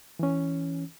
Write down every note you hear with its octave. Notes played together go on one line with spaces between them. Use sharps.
E3 C#4